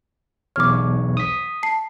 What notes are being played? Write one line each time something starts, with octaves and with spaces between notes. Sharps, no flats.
B1 E2 C#5 D6 F6
D#6 B6
A5 C7